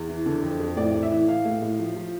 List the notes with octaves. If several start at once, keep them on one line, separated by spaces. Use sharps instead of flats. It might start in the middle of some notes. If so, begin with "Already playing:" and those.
Already playing: E2
E3
D3
F2
F2
A2 D5
A2
E5
E3
E3 F5
A2
A2
F3
F3